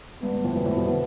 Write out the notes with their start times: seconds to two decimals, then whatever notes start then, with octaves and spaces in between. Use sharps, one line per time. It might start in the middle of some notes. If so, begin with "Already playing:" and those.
0.23 G2 B3
0.33 G2
0.44 F2 A2
0.55 G2 B2 B3
0.66 F2 A2
0.77 G2 B2
0.88 B2 D3